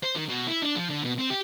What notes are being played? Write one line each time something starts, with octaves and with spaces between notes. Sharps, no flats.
C5
D#3
B2
E4
D4
F3
D3
B2
C4
G4